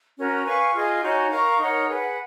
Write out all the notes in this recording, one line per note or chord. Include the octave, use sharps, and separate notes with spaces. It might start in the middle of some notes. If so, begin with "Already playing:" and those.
C#4 F#4 A#4
B4 F5 G#5 C#6
F4 G#4 D#5
D#4 F#4 C#5 G#5
A#4 F5 A#5 C#6
D#4 A#4 C#5 F#5
G#4 B4 F#5